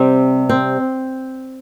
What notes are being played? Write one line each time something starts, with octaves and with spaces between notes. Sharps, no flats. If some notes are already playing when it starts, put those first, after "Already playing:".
Already playing: C3 G3 C4
C4